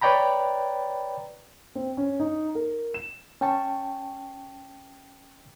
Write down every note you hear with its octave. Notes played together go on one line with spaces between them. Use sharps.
B4 C#5 D5 G5 A#5 B5
C4
C#4
D#4
A#4
E7
C#4 G5 A5 C#6